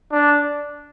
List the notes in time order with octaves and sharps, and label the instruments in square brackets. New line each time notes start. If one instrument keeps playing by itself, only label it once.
[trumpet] D4